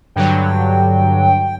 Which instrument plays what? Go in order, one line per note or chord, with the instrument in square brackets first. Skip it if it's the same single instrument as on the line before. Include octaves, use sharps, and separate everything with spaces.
[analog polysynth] G2 D3 F#3 [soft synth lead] G5